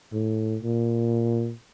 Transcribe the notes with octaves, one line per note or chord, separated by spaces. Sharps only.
A2
A#2